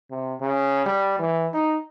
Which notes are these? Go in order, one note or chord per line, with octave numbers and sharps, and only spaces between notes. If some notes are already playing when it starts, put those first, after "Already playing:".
C3
C#3
G3
E3
D#4